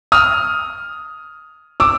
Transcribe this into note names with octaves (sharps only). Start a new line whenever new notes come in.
D#6 F6
D6 E6